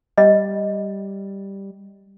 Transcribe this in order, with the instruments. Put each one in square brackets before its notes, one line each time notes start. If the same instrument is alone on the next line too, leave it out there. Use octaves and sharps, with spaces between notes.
[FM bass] G3 [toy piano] D#5